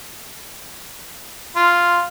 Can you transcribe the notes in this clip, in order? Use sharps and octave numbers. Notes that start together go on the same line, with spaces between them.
F4